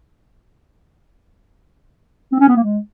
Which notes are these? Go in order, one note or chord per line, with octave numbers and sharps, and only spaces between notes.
C4
C#4
B3
A#3
G#3